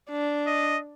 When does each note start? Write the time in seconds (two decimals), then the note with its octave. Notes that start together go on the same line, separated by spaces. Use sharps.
0.10 D4
0.47 D#5